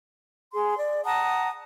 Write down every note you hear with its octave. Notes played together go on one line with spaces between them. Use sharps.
G#4 C6
D5
F#5 A5 A#5 D#6